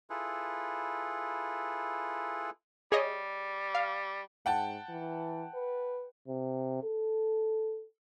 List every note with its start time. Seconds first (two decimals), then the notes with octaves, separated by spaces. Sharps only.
0.10 E4 F4 G#4 A4 B4
2.92 G3 G#4 C#5 D#5
3.75 F5
4.46 G#2 F#5 G5 A5
4.89 E3
5.54 B4
6.28 C3
6.83 A4